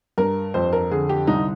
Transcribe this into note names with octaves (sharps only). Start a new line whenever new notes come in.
G2 A#4
F2 C5
A#4
D3 G#4
G4
C2 D#4